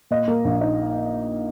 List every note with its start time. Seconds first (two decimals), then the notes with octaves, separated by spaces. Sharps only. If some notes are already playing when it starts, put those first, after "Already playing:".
0.11 A#2 D#5
0.28 A#3
0.45 A#1
0.61 D#4